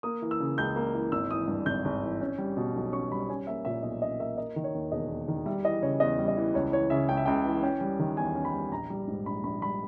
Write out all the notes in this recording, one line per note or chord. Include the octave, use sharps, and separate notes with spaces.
A#3 D#6
E3
E6
C#3
C#2 G6
A#3
E3
G#1 E6
E3 D#6
G2
G#1 G6
G#1
E3
C#4
G3
B2
B1
C#4 C#6
G3 B5
C#4 G#5
A#3 E5
A#2 E5
B1 D#5
C#4 D#5
A#3 E5
A#3 D#5
D#3
C#5
D#2
E1 D#5
A#3
D#3
G3 E5
E3 D#5
C#3 C#5
E2 D#5
G3
D#5
E3
C#2 C#5
E3 C#5
C#3 E5
C#2 G5
E5
C#2 G5
E3
C#4 G5
G3
D#3
E2 G#5
C#4
B5
G3
A#1 A#5
G3
G#2
A#1 B5
A#1 B5
G3 B5